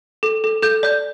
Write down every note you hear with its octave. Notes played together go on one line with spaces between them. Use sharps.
A4
A4
A4 G6
D5 G6